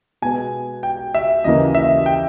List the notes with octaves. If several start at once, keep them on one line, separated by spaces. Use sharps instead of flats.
B2 G#3 B3 G#5
G5
E5
D#2 C#3 E3 A#3 D#5
E5
G5